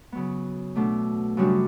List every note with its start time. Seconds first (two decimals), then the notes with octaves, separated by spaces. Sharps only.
0.12 C#3 F#3 B3
0.76 B2 A3 D4
1.37 F#2 C#3 G3 D4 F#4